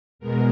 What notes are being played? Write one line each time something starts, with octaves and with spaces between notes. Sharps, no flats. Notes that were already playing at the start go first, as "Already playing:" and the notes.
E2 B2 G#3 A#4